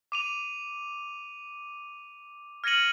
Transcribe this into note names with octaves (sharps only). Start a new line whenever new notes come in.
D6 D#7 F7
F6 G#6 A#6 C#7 D#7 F#7